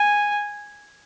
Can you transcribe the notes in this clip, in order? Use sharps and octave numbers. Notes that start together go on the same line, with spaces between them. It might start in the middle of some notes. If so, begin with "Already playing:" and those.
Already playing: G#5